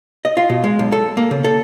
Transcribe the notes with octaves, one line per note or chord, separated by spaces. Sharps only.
D#5
F4
B2
G#3
B1
A4
A#3
C#3
A4